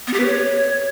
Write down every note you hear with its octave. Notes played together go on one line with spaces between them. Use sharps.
B3
G4
B4
C#5